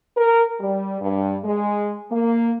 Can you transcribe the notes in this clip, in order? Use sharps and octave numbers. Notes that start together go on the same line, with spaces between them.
A#4
G3
G2
G#3
A#3